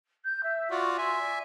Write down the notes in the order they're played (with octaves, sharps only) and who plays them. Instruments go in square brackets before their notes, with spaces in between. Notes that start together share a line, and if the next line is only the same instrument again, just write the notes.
[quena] G6
E5
[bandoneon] F4 F#4 D5 [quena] C#6
[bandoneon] E5 G#5 [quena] C6
[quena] D5